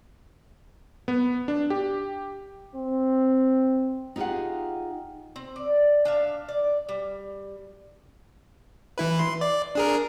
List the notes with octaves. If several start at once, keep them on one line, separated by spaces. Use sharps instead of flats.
B3
D4
G4
C4
D#4 F4 G4 G#4 F#5
C4
D5
D4 E5 F5
D5
G3
E3 E4 B4
C6
D5
D4 G#4 A#4